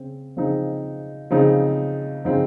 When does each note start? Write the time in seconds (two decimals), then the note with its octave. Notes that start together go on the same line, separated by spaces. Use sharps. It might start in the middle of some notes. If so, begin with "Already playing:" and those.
Already playing: C#3 C4
0.37 C#3 F3 C4 D#4
1.31 C#3 F3 C4 D#4
2.25 C#3 F3 C4 D#4